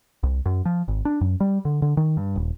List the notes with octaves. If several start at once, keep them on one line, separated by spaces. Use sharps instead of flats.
C2
F#2
F3
G#1
D4
F#2
G3
D3
D3
D#3
G2
D#1